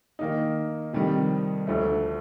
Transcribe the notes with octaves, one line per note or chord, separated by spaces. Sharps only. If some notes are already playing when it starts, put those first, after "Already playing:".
D#3 A#3 D#4
F2 C3 D#3 G3
D2 D3 F3 A3